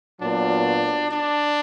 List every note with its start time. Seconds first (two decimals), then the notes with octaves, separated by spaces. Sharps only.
0.20 A#2 F#3 B3 D4
1.10 D4